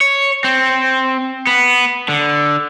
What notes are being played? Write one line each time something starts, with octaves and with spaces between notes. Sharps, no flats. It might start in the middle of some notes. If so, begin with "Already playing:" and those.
C#5
C4
B3
D3